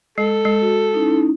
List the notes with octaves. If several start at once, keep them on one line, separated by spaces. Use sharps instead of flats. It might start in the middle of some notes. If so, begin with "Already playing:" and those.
G#3 A4
G#3
F#4
C#4 D#4 E4